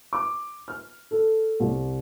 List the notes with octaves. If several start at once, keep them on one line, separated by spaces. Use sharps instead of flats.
D6
F6
A4
C2